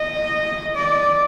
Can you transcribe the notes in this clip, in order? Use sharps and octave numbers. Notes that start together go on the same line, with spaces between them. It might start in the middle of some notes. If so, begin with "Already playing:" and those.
Already playing: D#5
D5